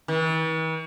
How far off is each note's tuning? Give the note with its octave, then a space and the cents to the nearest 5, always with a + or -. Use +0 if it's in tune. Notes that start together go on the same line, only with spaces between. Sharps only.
E3 -45